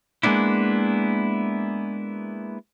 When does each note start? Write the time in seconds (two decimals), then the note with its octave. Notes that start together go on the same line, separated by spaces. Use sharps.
0.23 G#3 A#3 B3 D4 E4